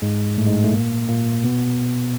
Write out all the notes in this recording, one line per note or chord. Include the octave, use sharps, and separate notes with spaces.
G#2 G#3
A2 A3
G#2 G#3
A2 A3
A#2 A#3
A#2 A#3
B2 B3